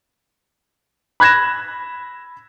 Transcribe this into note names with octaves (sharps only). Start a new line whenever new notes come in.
B5 F#6 G#6 A#6 E7